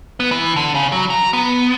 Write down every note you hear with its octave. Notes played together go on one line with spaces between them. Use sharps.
B3
E3
D3
C#3
F#3
A#5
B3